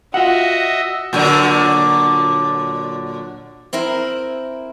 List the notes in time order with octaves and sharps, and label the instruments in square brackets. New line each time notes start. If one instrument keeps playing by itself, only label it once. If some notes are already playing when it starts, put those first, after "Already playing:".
[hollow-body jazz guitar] F4 F#5 [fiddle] F#4 [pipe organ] D#5 E5
[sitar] A#2 D3 F#3
[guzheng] C4 E4 A#4